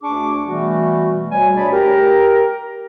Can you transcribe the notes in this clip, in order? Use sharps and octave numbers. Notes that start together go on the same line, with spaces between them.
D2 D4 G#4 C#6 D6
B2 E3 G3 A3 B3 F#4
D2 B2 G3 C#5 G#5
D2 D4 G#4 C#5 D5 B5
G4 A#4